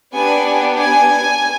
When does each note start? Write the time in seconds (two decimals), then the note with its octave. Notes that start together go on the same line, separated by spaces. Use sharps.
0.15 B3 D4 G4 G#5
0.79 G#5